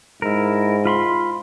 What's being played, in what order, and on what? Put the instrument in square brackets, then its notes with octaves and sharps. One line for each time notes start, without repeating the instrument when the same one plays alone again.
[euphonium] G#2 [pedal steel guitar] E4 A#4
[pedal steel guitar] F4 B5 C6